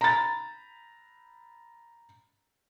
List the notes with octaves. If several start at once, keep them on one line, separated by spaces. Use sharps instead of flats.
A#5 B5 A6